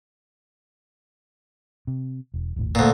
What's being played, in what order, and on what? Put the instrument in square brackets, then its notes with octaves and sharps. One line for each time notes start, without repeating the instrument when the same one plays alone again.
[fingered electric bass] C3
E1
D#1 G#1 A2
[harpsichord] D2 A#2